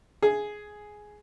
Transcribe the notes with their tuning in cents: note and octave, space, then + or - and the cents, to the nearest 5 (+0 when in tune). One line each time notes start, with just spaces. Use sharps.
G#4 +5